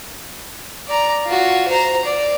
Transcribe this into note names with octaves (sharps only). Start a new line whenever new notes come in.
D5 A#5
F4 F#4
C5 A#5
D5